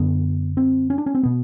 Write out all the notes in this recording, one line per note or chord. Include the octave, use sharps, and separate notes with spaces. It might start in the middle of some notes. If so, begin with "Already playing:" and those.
Already playing: F#2 D3 B3
C4
C#4
D4
C#4
C4
B2 B3